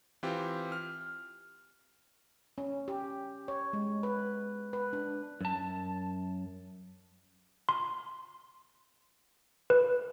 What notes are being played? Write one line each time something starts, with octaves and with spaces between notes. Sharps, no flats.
E3 C4 F4 G4
F6
C#4
G4
C#5
G#3
B4
B4
D4
F#2 A5
C6
B4